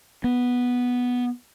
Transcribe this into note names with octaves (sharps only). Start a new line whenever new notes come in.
B3